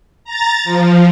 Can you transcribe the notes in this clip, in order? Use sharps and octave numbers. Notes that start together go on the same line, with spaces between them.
A#5 A6
F3